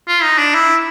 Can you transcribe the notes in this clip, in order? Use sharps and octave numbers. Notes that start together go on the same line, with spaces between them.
F4
D#4
D4
E4